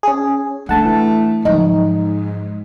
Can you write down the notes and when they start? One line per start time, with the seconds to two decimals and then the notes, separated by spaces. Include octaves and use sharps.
0.03 C#4 G#4
0.69 A3 D4 F#5 A5
0.85 E3
1.45 G#2 F3 F#3 D#4